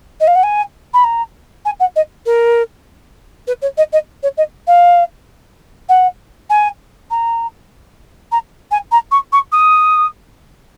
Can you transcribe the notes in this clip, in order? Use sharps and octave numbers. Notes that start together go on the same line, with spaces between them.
D#5
F5
F#5
G#5
B5
A#5
G#5
F#5
D#5
A#4
B4
C#5
D#5
D#5
C#5
D#5
F5
F#5
G#5
A#5
A#5
G#5
A#5
C#6
C#6
D#6